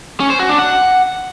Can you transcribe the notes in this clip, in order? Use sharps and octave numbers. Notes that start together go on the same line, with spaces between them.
C#4
C5
F#4
D4
F#5